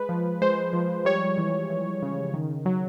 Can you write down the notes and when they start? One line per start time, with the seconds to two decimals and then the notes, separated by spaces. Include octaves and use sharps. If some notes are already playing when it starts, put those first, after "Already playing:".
Already playing: G#3 B4
0.09 F3
0.42 G#3 C5
0.73 F3
1.05 G3 C#5
1.38 E3
1.70 E3
2.02 C#3
2.34 D#3
2.66 F#3